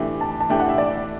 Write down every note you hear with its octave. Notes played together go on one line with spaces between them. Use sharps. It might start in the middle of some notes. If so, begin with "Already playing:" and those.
Already playing: E3 A3 D4 G4
A5
A5
E3 A3 D4 G4 G5
F#5
E5
D5